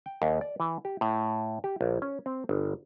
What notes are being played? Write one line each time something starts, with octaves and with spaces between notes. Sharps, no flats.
G5
D#2
D5
E3
G4
A2
G4
A#1
C#4
C4
G1